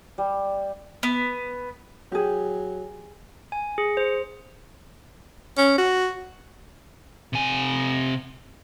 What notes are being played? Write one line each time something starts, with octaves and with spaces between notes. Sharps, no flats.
G3
B3
F#3 G4 G#4
G#5
G#4
C5
C#4
F#4
C3 G#5